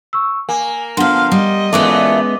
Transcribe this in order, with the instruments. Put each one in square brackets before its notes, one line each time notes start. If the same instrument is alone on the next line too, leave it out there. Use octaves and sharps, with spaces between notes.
[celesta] C#6 E6
[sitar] A#3 [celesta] G#5
[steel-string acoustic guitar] D3 F3 [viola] B3 F5 [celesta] F#5 C6
[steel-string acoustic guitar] G3 [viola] D#5
[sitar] A#2 E3 A3 [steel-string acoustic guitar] G#3 B3 C#4 [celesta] D6